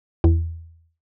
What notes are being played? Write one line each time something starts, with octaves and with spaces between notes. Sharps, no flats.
E2